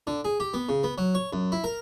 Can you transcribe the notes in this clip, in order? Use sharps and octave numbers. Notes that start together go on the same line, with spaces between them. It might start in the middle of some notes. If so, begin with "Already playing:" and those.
D3
G#4
G4
B3
C#3
B3
F#3
C#5
F#2
E4
A#4